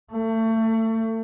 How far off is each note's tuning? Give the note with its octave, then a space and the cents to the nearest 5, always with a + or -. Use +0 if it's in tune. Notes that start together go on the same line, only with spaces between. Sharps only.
A3 +30